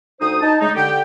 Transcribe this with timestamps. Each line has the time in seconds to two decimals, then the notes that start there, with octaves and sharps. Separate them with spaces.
0.21 D2 D#4 C5 D#6
0.42 D#4 A5
0.61 C#3 G#3 A3 D#4
0.75 D3 G4 G5